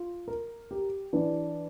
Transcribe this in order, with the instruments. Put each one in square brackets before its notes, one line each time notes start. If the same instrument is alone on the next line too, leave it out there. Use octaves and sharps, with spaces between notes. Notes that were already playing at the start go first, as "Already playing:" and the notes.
Already playing: [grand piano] F4
A#4
G4
[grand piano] E3 [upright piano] D4